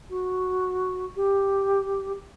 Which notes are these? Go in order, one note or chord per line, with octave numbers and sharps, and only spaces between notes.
F#4
G4